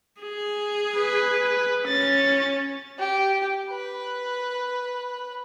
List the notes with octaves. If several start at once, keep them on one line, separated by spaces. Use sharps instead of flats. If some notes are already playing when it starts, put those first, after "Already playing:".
G#4
B4
C#4 A6
G4
B4